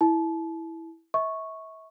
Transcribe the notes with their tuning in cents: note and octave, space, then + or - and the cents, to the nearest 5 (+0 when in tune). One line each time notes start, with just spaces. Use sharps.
E4 -5 A5 -35
E5 -35 C#6 -5